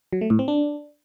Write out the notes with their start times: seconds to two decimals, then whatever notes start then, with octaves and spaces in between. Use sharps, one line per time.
0.13 F#3
0.21 A3
0.30 A2
0.39 C4
0.48 D4